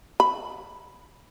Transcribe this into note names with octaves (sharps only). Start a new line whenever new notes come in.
B5